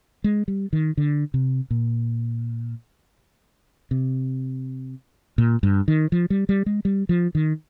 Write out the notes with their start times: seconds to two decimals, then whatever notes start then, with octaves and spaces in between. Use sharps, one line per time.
0.24 G#3
0.48 G3
0.73 D#3
0.97 D3
1.34 C3
1.70 A#2
3.91 C3
5.38 A#2
5.63 G2
5.88 D#3
6.12 F3
6.30 G3
6.49 G3
6.66 G#3
6.85 G3
7.09 F3
7.35 D#3